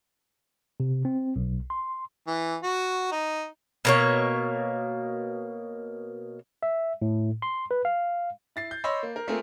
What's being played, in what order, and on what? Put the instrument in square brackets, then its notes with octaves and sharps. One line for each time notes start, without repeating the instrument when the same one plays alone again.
[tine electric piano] C3
C4
B1
C6
[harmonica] E3
F#4
D#4
[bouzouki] B2 A#3 C#5
[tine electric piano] E5
A2
C6
B4
F5
[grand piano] E4 A6 C7
G6
C#5 D#5 B5 C6 E6
A#3
A#4
A3 A#3 C4 F4 G#4 A#4